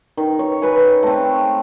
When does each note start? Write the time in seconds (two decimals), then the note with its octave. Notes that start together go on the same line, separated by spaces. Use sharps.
0.17 D#3
0.39 C#5
0.62 B4 G#5
1.03 A3 C4